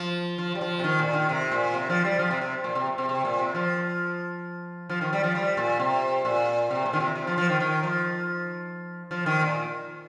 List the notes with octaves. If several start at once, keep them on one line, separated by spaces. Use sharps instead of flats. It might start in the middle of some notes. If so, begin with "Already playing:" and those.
Already playing: F3
F3
G3
F3
C3
D#3
A#2
D#3
C3
A#2
C3
F3
G3
F3
C3
C3
A#2
C3
C3
C3
A#2
C3
F3
F3
D#3
G3
F3
G3
A#2
C3
A#2
C3
A#2
D#3
C3
C3
F3
F3
D#3
D#3
F3
F3
D#3
A#2